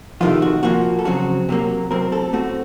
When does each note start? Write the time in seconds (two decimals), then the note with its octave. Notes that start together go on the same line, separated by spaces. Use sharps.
0.21 F2 C3 D#3 A3 F4
0.42 F#4
0.63 A#2 F3 A#3 F#4
0.99 A4
1.05 F2 C#3 F#3 C4 F#4
1.49 C3 F#3 A#3
1.91 A2 F#3 C4 A#4
2.12 A4
2.33 A2 A3 C4 F#4